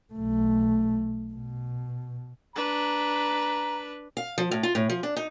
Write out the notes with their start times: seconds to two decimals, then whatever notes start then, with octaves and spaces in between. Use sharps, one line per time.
0.13 B1 A3
1.34 B2
2.55 D4 B4 A#5
4.17 F5
4.38 F3
4.51 A2
4.63 F4
4.75 A2
4.89 F3
5.03 D4
5.16 D#4